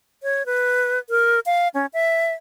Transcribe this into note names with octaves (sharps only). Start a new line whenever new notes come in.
C#5
B4
A#4
F5
C#4
E5